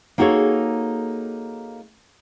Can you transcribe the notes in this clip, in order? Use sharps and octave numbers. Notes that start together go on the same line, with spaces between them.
A#3 D#4 F#4 G#4 A4 C#5